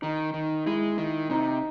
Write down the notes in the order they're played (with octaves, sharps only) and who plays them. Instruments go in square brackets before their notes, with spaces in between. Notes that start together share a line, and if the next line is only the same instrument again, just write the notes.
[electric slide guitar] D#3 [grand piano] D#4
[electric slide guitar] D#3
[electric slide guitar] G#3 [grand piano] E4
[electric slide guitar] D#3
[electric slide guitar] C3 [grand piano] D#4